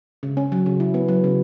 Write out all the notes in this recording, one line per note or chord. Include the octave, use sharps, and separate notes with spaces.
C#3
C#4
F#3
C#3
E4
B3
F#3
C#3